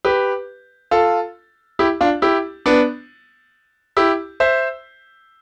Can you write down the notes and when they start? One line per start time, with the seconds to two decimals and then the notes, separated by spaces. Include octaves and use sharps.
0.05 G4 B4
0.91 F4 A4
1.79 E4 G4
2.01 D4 F4
2.22 E4 G4
2.66 B3 D4
3.97 E4 G4
4.40 C5 E5